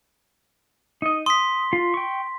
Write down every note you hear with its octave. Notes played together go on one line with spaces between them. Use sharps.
D#4 D#5
C6 D#6 B6
F4
G5 C#6